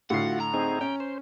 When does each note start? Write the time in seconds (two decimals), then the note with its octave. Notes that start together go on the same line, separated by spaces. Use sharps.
0.10 A2 D3 F4 F#4 F#5 C7
0.40 A#5
0.54 C4 D#4 G#4
0.81 C#4 G5
1.00 C5